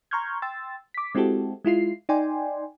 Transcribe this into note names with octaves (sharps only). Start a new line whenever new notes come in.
A#5 C6 C#6 F6 G6 G#6
G5 C6 E6 A6
D6 B6
G#3 C4 E4 F#4 G4 A4
G#3 E4 F4 C7
D#4 D5 G5 G#5 C6